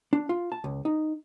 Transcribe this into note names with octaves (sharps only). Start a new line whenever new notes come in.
D4
F4
A5
C#2
D#4